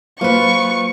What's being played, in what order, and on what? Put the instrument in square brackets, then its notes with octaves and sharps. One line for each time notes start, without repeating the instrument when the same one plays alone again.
[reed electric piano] F#3 A#3 C5 [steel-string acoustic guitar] F4 B4 [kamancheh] C#6